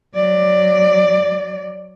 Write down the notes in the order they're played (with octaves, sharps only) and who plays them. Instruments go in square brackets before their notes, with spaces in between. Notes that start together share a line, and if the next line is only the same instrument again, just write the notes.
[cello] F#3 D5